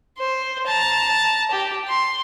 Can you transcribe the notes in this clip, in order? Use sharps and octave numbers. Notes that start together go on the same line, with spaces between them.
C5
A5 A#5
G4
C6